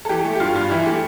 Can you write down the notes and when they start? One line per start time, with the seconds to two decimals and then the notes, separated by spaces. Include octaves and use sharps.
0.05 A4
0.09 E3 G4
0.25 A3
0.35 G4
0.40 G2 F4
0.55 G2 F4
0.71 E3 E4
0.86 A3 G4